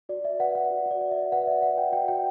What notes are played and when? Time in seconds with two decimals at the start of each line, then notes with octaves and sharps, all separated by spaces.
0.09 F#4 D5
0.24 D5 E5
0.39 B4 F#5
0.55 D5 F#5
0.71 F#4
0.86 F#4 D5
1.01 D5
1.11 E5
1.16 D5
1.32 B4 F#5
1.47 D5 E5
1.62 B4 F#5
1.77 F#4 G5
1.92 F#4 G5
2.08 F#4 G5